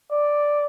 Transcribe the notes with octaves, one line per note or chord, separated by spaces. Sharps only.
D5